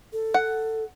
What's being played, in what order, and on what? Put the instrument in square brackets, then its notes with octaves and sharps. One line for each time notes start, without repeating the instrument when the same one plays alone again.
[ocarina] A4
[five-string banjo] F#5